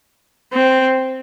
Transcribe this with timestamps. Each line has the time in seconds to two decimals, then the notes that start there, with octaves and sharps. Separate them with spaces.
0.53 C4